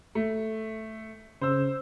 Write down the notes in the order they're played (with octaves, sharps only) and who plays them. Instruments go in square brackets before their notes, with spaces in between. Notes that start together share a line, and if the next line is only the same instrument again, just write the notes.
[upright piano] A3
[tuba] C#3 [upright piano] C5 E6